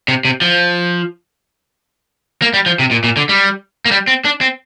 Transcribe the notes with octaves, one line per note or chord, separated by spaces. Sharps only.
C3
C3
F3
A#3
G3
F3
C3
A#2
A#2
D3
G3
A#3
G3
C4
D4
C4